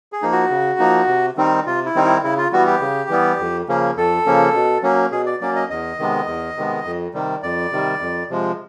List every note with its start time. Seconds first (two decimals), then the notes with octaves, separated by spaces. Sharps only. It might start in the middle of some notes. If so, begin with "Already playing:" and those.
0.12 G#4
0.22 F3 A#3 D#4
0.32 F#4
0.50 C#3
0.79 F3 A#3 D#4
1.08 C3
1.37 D#3 G3 C4 D#4
1.66 C3 F4
1.86 E4
1.95 D#3 G3 C4 D#4
2.05 E4
2.23 C#3 E4
2.38 F4
2.53 E3 G3 B3 F#4
2.67 G4
2.81 C#3
3.09 E3 G3 B3
3.39 F2
3.68 C#3 F3 A#3 C#4
3.96 F2 A4
4.26 C#3 F3 A#3 C#4
4.54 B2
4.83 F#3 A#3 C#4
5.12 B2 G#4
5.26 D5
5.41 F#3 A#3 C#4 D5
5.56 D#5
5.69 E2 D#5
5.99 C3 D#3 G#3 B3
6.27 E2
6.57 C3 D#3 G#3 B3
6.85 F2
7.13 C3 D#3 G3
7.43 F2 D5
7.72 C3 D#3 G3
8.00 F2
8.30 C3 F3 G#3